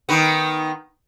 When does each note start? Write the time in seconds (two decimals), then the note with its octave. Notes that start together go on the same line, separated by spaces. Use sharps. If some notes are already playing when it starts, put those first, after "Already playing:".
0.09 D#3 B3